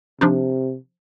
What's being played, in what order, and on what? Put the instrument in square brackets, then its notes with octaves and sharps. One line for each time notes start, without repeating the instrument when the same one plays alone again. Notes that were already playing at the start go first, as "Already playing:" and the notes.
[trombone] C3 [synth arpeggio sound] F3 D4 D#4